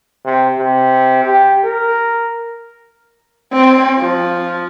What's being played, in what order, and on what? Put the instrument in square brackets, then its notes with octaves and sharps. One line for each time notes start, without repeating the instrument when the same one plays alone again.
[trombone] C3
C3
G4
A#4
[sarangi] C4
F3